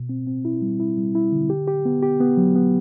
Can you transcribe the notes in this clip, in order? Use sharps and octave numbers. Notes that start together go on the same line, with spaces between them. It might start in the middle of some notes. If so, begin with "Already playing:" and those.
Already playing: B2
C4
C4
E4
G3
E4
G3
E4
D3
G4
G4
B3
G4
B3
F#3
B3